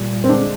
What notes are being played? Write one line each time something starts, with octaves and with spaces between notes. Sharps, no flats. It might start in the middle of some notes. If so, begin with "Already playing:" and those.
Already playing: A#2 G3
C4
D3 G#3 D4